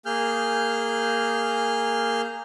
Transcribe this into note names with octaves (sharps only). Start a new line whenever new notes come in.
A#3 G#4 F6 G6